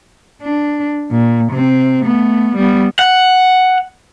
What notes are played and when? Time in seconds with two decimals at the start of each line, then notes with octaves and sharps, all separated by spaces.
0.42 D4
1.11 A#2
1.52 C3 C4
2.04 A3 B3
2.56 G3 B3
2.99 F#5